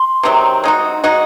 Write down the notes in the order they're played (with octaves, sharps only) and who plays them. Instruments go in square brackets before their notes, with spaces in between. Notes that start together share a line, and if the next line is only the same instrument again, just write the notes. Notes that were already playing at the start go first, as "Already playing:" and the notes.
Already playing: [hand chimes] C6
[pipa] C3 D#3 F#3 C4
G#3 D#4 F#4
G#3 D#4 F#4